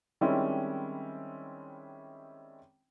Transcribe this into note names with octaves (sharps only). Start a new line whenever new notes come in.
D#3 G3 G#3 C4 C#4 E4